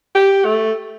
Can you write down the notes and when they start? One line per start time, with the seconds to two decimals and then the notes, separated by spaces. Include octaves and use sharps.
0.15 G4
0.45 A3